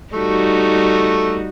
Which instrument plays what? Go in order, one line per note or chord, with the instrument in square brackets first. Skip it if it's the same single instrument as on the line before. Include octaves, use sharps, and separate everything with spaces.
[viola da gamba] G3 D#4 F#4 [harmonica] A3